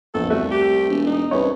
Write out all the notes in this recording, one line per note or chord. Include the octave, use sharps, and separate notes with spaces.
F1 A#1 E2 A4
C2 A3 F#4
G4
E1
D#4
C2 C#4 B4 C#5